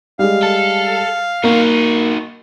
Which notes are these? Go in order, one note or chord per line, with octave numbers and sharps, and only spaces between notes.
G3 G#3 F5
A4
A#3 D#4 F#4